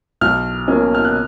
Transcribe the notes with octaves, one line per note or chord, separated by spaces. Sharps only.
B1 F6
B2 A#3 C#4
F6
F#6